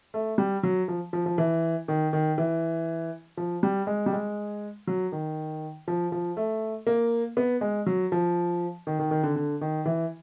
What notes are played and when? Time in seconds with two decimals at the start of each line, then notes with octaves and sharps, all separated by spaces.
0.14 A3
0.38 G3
0.63 F#3
0.88 F3
1.13 F3
1.26 F3
1.38 E3
1.88 D#3
2.13 D#3
2.38 E3
3.37 F3
3.63 G3
3.87 G#3
4.06 G3
4.13 G#3
4.87 F#3
5.12 D#3
5.88 F3
6.12 F3
6.37 A3
6.87 A#3
7.37 B3
7.61 G#3
7.86 F#3
8.12 F3
8.87 D#3
8.99 D#3
9.11 D#3
9.23 D3
9.36 D3
9.61 D#3
9.85 E3